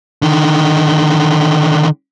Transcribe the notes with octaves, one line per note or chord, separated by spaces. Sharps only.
D3 D#3